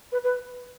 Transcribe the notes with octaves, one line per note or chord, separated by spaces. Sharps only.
B4
B4